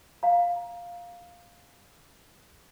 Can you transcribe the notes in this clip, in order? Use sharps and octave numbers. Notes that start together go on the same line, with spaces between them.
F5 A#5